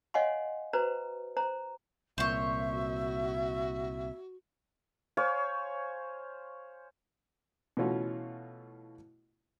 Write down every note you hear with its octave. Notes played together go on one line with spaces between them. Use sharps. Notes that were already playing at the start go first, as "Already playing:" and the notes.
C#5 D#5 F5 F#5 G#5 C6
F#4 B4 C5 A#5
C5 A#5
C2 A#2 C5 C#5 E5
F#4
C5 C#5 F5 G#5
B2 E3 A3 C#4 F4 F#4